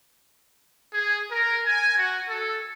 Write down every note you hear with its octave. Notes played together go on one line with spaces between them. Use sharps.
G#4
A#4
G#5
F#4
A4